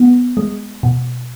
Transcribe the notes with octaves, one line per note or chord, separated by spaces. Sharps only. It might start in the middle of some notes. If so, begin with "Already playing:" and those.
Already playing: B3
G#3
B2